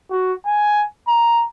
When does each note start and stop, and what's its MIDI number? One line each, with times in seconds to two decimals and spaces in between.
0.11 0.33 66
0.46 0.85 80
1.08 1.45 82